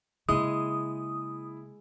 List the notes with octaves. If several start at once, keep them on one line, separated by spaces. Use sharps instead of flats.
C#3 G#3 A#3 E4 D#6